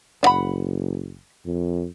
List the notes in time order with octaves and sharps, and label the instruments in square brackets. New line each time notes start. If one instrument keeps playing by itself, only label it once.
[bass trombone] F#1 [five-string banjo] D4 F#5 B5
[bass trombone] F2